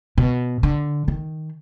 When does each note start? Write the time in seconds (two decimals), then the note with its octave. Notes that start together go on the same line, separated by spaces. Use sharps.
0.18 B2
0.63 D3
1.08 D#3